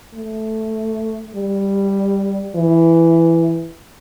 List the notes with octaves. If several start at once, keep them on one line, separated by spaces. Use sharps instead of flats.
A3
G3
E3